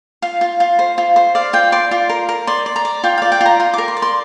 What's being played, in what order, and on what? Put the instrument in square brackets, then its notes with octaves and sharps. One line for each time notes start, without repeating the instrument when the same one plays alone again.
[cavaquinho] F4 F5
F4
F4
C5
F4
C5
D5 F5
F4 G5
D5 C6
F4
A#4
A#4
D5 C6
D5
A#5
D5
F4 G5
D5 F5
G5
F4
A#5
F4 C6
A#4 D6
C6
D5
C6